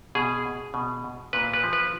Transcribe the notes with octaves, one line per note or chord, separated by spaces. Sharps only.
B2 G#4
B2
A#2 B4
B4
F3
B4